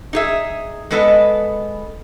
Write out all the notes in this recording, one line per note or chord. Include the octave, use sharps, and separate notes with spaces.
D#4 G#4 E5
G#3 B3 A4 B4 D5 D#5